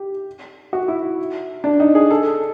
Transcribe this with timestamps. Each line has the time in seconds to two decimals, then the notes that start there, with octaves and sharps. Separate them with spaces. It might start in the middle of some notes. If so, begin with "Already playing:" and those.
Already playing: G4
0.73 F#4
0.88 E4
1.64 D4
1.80 D#4
1.95 G#4
2.11 A4